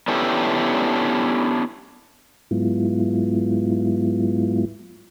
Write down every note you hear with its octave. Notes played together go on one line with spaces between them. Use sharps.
B3 C#4 D4 E4 G4 A4
G#2 F#3 G#3 B3 E4 F4